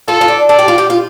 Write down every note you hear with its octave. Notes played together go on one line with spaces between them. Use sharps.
F4 A4
F4
D4
A4 D5
G4
F4
G4
F4